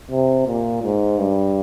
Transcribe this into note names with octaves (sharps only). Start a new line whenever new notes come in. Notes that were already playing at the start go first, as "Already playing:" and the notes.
C3
A#2
G#2
G2